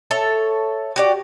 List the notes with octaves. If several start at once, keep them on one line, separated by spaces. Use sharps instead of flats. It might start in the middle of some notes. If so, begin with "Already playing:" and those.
A4 C#5 E5
F#4 G4 D5